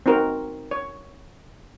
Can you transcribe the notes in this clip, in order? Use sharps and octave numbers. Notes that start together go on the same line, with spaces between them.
C4 D#4 F#4 A#4
C#5